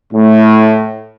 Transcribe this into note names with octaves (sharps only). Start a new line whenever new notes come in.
A2